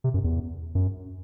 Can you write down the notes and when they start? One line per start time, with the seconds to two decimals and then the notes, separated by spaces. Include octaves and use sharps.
0.04 C3
0.14 F#2
0.24 E2
0.75 F#2